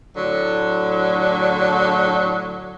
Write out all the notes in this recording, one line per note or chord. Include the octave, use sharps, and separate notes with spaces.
A2 D3 F#3